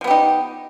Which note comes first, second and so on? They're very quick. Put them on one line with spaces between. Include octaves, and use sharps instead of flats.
F3 B3 G4 D#4